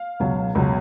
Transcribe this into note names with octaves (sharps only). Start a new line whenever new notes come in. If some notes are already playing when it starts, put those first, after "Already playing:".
Already playing: F5
C#2 B2 F#3
C#2 B2 F#3